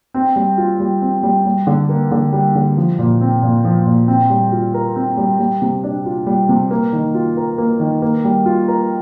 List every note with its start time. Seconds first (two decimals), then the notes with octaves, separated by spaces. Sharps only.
0.14 C4
0.36 G3
0.58 F4
0.80 G3
1.02 C4
1.23 G3
1.46 G3
1.67 D3
1.89 A#3
2.12 D3
2.32 G3
2.55 D3
2.77 F3
2.99 A#2
3.21 C4
3.42 A#2
3.65 F3
3.86 A#2
4.08 C4
4.30 G3
4.52 F4
4.74 A#4
4.96 C4
5.17 G3
5.39 G3
5.62 C3
5.84 D4
6.06 F4
6.27 G3
6.49 C3
6.71 A#3
6.93 D#3
7.14 F4
7.37 A#4
7.58 A#3
7.80 D#3
8.02 A#3
8.24 G3
8.46 F4
8.68 A#4